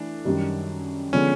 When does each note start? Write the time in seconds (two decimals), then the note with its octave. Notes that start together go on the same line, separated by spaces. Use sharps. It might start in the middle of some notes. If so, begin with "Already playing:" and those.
Already playing: E3 A3 D4
0.25 F#2 D#3 G3
1.13 D3 F3 G#3 B3 C#4